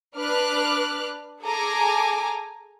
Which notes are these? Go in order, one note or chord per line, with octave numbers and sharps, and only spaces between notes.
D4 B4 D6 F6 F#6
G#4 A4 G#5 A#5 D6